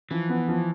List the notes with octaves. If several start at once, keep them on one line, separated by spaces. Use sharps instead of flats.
E3 F3
B3
F3